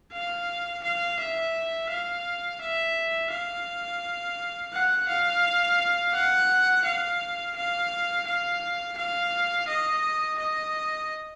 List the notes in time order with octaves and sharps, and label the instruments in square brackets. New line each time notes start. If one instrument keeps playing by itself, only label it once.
[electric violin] F5
F5
E5
F5
E5
F5
F#5
F5
F#5
F5
F5
F5
F5
D#5
D#5